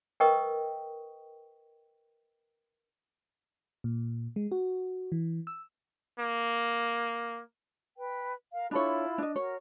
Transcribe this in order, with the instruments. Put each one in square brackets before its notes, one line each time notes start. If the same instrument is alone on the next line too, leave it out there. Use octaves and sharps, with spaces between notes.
[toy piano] A#4 B4 D#5 G5 C#6 D#6
[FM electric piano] A#2
G#3
F#4
E3
E6
[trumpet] A#3
[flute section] B4 G5
A#4 F5
[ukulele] D4 A4 C#5 [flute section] E4 F4 B5
[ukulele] D4 D#5
[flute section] F#4 A#4 [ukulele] C#5